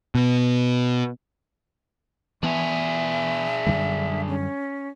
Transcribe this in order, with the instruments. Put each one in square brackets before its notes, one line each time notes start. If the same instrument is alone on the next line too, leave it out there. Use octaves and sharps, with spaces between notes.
[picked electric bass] B2
[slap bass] E3 B3 [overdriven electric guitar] D4 G#4 [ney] E5
[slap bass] F#2 D3 G3
[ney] C#4